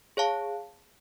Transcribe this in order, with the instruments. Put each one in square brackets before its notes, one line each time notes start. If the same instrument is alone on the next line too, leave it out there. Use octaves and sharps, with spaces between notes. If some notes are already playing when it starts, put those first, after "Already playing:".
[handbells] G#4 C#5 F5 A5